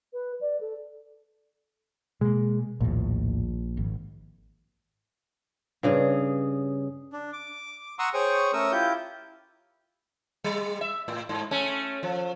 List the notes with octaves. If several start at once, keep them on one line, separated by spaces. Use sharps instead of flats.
B4
D5
A4
B2 G#3 A#3
A#1 D#2 A2
G#1
G2 C#3 G#4
D4
D6
F#5 A#5 C6 C#6 D#6 E6
G#4 C5 C#5 G5 C#6 D#6
A3 C#4 A#4 C#6 D#6 E6
E4 F4 G4 G6
G3
E5
A2
G#2
A3 C#4
F3